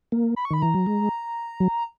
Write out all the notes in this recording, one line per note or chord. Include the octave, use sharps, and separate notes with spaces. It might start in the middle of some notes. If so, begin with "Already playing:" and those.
A#3
B5
C#6
D#3 B5
E3 A#5
F#3
G#3
F#3